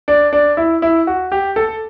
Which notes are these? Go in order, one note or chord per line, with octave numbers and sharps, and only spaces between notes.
D4
D4
E4
E4
F#4
G4
A4